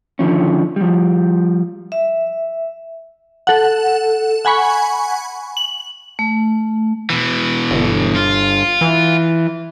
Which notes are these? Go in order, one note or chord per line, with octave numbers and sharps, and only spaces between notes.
D3 D#3 F3 C#4
F3 G3
E5
A4 F#5
F#5 G#5 B5 C#6
F#7
A3
B2 E3
G1
F4
E3